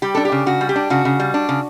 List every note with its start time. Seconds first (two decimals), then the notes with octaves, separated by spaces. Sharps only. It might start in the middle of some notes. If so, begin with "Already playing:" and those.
0.02 G3 G4
0.15 D4 A4
0.25 G4
0.32 C#3
0.46 C#3 F#4
0.61 G3
0.69 G4
0.76 D4
0.90 C#3 F#4
1.05 C#3
1.20 G3
1.34 D4
1.49 C#3